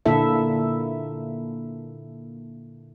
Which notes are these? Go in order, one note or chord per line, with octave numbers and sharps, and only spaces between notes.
A#2 D3 A#3 E4 A4 E5